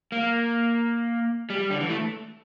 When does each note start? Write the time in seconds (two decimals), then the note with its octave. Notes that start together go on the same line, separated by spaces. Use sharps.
0.12 A#3
1.50 G3
1.70 D3
1.80 E3
1.90 A3